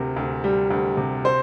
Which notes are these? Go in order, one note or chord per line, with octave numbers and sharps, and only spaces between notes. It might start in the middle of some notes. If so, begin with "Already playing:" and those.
Already playing: D2 C3 A#4
D2
G3
D2
C3
C5